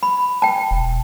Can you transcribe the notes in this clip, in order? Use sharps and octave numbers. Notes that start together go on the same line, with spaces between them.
B5
G5 A5
E1